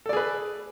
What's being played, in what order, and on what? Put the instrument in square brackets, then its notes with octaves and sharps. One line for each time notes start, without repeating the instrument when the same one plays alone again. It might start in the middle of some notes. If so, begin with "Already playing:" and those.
[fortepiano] A4
D5
G#4
B4